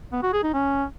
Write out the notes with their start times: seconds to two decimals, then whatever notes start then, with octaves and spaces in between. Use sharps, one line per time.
0.12 B3
0.23 F#4
0.33 G#4
0.43 D#4
0.53 C#4